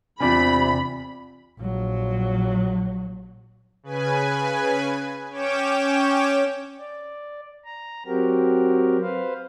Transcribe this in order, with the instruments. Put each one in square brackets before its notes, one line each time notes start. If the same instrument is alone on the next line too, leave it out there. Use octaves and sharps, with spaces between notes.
[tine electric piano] E2 D5 G#5 [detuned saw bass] C3 [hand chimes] C4 D4 F4 [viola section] B5
[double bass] A#1 F#3
[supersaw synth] C#3 B4 G#5
C#4 C#5 G5 D6 E7
[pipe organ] D5
A#5
F#3 C4 F#4 G4 A#4
B4 C5 F5